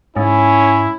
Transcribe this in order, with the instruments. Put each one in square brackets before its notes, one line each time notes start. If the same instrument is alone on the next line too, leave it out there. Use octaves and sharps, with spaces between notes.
[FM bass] G#2 [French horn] C#4 [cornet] E4